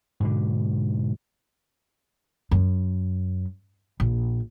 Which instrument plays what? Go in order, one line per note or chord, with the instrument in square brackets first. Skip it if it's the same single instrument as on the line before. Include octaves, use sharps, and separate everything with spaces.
[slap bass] G#2 B2 D3
[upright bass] F#2
A#1